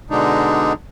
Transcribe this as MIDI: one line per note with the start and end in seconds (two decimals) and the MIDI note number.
0.10 0.73 47
0.10 0.73 50
0.10 0.73 56
0.10 0.73 62
0.10 0.73 63